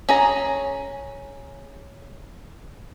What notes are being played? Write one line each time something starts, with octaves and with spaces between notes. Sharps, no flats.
C#4 G#4 A#5